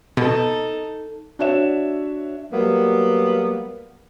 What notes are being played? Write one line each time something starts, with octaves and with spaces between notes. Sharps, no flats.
B2 D#4 A4
D4 F#4 C#5 E5 E7
F#3 G3 A#3 B3